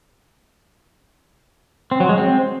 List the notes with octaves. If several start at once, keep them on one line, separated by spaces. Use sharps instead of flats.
C4
F#3
G#3
C4